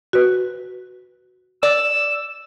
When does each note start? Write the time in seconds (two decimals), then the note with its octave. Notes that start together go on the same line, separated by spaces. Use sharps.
0.13 F#4 B4
1.63 D5 E6